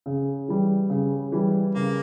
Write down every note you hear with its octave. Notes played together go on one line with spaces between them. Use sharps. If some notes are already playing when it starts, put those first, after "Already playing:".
C#3
E3 G3
C#3
E3 G3
C#3 A#3